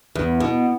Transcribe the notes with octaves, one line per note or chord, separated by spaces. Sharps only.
E2
B2